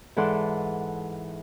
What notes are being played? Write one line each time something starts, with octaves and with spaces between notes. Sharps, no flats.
G#2 E3 A4 D5 F#5 C6